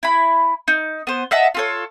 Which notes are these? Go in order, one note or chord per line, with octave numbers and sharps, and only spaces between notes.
E4 B5
D#4
B3 C5
D#5 E5 F#5 A5
F4 A4 C#5